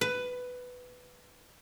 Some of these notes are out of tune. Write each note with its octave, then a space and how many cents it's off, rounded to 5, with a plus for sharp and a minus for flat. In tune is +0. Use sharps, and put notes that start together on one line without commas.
B4 +10